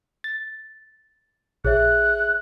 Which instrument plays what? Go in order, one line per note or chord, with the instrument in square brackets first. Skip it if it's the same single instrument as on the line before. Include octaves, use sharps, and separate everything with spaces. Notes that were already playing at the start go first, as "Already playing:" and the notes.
[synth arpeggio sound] A6
[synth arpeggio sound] A#1 [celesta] G#4 C#5 E5 [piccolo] F#6